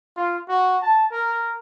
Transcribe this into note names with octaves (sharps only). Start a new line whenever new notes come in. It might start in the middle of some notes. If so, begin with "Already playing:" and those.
F4
F#4
A5
A#4